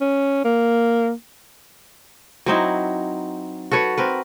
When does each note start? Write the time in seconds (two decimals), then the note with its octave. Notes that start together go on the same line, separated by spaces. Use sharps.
0.01 C#4
0.44 A#3
2.46 F#3 C4 D#4 E4
3.71 F#4 A4 B4 C#5
3.98 C4 A#4 B4